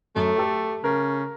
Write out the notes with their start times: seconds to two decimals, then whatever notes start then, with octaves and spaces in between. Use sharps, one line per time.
0.16 F#2 A3
0.37 G4 A4
0.84 C#3 A#4